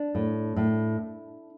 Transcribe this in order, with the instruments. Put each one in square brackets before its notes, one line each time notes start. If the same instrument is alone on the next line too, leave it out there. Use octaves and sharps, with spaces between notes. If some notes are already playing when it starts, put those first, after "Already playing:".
Already playing: [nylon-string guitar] D4
A2
A2